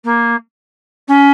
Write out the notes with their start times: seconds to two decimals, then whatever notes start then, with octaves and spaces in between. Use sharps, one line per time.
0.04 A#3
1.08 C#4